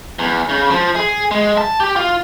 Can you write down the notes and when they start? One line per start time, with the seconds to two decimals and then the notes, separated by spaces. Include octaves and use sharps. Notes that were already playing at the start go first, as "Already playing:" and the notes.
0.19 E2
0.49 C#3
0.71 F3
0.96 G#4
1.31 G#3
1.58 A5
1.80 G4
1.96 F4